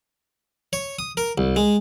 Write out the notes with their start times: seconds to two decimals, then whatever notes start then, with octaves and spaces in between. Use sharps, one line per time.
0.73 C#5
0.99 D#6
1.17 A#4
1.38 C2
1.56 G#3